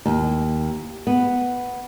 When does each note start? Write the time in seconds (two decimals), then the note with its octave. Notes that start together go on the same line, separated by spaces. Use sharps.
0.06 D#2
1.07 B3